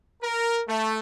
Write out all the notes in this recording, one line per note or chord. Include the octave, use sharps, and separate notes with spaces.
A#4
A3